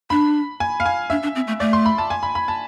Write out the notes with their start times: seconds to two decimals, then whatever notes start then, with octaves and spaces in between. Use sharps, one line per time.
0.10 D4 B5
0.60 G#5
0.80 F5
0.86 G#5
1.10 D4 E5
1.23 D4
1.35 C4
1.47 A3
1.60 A3 D5
1.73 C6
1.86 B5
1.98 A5
2.10 G#5
2.23 B5
2.35 B5
2.48 A5